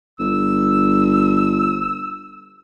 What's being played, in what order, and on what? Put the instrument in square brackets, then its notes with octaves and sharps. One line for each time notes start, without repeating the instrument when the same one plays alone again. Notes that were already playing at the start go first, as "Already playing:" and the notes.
[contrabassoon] G1 [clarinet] E6